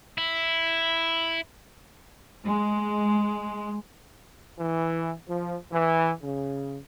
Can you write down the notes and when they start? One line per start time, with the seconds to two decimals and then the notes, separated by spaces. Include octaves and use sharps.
0.18 E4
2.44 G#3
4.59 E3
5.28 F3
5.72 E3
6.22 C#3